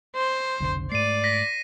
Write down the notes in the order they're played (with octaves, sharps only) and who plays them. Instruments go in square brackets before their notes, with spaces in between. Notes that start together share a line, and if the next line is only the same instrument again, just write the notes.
[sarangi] C5
[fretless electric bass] F1 B1 D3
[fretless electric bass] G#2 A3 [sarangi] D5 [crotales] C7 D#7
[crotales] A#6 B6